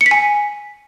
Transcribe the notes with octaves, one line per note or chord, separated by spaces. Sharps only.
C#7
B6
G#5